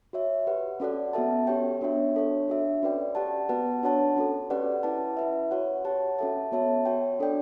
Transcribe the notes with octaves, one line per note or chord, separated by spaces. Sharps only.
F#4 C#5 E5
G4 B4 F#5
C#4 F#4 A4 D5 F#5
B3 F#4 A4 E5 A5
C#4 G4 C#5 G5
B3 D4 F#4 C#5 E5
D4 A4 C#5
D4 F#4 A4 E5
C#4 F#4 B4 D5 G5
G4 D5 F#5 A5
B3 F#4 B4 F#5 A5
D4 F#4 C#5 F#5 A5
C#4 F#4 A4
C#4 G4 B4 D5 F#5
C#4 E4 B4 F#5 A5
E4 B4 E5
F#4 C#5 F#5
G4 C#5 F#5 A5
C#4 F#4 A4 E5 A5
B3 F#4 C#5 E5 A5
F#4 C#5 G5
D4 A4 D5 G5